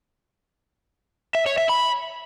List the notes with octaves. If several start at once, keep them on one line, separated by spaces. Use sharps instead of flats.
E5
C#5
E5
B5